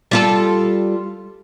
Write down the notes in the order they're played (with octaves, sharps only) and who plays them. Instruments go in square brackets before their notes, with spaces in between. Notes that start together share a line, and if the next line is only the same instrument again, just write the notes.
[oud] G3 F4 A4